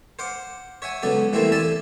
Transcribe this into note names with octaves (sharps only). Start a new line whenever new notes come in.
C5 F5 F#5 D6
C#5 E5 F#5 G#5
C#2 F#3 B3 A4 D5
E3 G3 A3 A#3 C4 E4
A4 D5 E5 G#5 A5